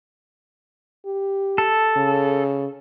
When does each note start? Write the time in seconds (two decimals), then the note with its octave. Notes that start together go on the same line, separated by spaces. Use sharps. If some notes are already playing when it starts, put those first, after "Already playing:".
1.06 G4
1.58 A4
1.97 C#3